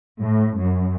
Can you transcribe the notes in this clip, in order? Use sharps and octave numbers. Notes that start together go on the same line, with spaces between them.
A2
F#2